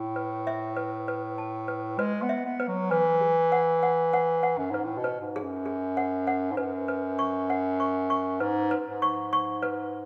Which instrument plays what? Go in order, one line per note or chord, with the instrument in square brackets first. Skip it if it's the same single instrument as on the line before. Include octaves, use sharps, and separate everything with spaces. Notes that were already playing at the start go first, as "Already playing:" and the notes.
Already playing: [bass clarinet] A2
[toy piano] B4
E5
B4
B4
A5
B4
[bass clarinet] G#3 [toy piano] B4
[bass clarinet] B3
[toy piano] E5
[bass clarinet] B3
[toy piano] B4
[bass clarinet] F#3
[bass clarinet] E3 [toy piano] B4
[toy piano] G#4
F#5
F#5
F#5
F#5
[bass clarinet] F#2
[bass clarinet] G#2 [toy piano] B4
[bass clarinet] A2
B2
[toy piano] B4
[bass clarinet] G#2
[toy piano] G#4
[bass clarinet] F#2
[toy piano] G#4
F#5
F#5
[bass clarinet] G#2
[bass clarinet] F#2 [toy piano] B4
[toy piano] B4
C#6
F#5
C#6
C#6
[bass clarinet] G#2 [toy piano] B4
[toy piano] B4
[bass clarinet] G#2
[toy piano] C#6
C#6
B4